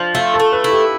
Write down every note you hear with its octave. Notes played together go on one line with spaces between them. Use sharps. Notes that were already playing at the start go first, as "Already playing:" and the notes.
Already playing: F3 D4
A3 F4
A4
A3
B4
E4
G4